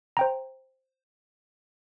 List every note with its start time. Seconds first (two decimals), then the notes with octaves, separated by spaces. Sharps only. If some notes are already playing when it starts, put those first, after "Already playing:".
0.17 C5 G5 A#5